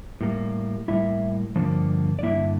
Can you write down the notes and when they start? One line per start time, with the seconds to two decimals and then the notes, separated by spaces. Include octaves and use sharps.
0.21 A2 G3 A#3
0.88 A2 G3 A#3 E4 E5
1.56 G2 D3 F3 A#3
2.19 D5
2.23 G2 D3 F3 A#3 E4 E5